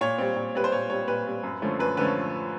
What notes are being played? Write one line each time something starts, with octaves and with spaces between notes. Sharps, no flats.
A#2 C#5
G3 C4
A#2
G3 C4 B4
C5
A#2 C#5
G3 C4 C#5
A#2 B4
G3 C4
F#2
D3 F3 A3 C#4
F#2 B4
D3 F3 A3 C#4 B4